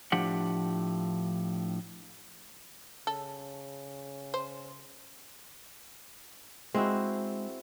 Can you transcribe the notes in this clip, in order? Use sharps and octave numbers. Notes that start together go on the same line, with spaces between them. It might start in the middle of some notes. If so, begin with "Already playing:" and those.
A2 F3 D4 G4 F#5
C#3 A4
C5
G#3 C4 E4 F#4